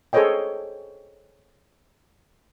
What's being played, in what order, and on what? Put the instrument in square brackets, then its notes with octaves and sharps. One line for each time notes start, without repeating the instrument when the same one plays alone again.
[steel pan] G#4 A4 C5 C#5 D#5 G5